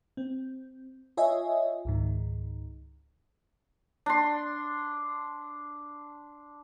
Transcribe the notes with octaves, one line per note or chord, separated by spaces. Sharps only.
C4
F4 C#5 D#5 E5 G#5
C#2 G#2 D#3
D4 C6